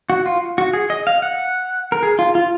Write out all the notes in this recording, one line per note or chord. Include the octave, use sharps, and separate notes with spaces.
F#4
F4
F#4
G#4
D#5
F5
F#5
A#4
G#4
F4
F4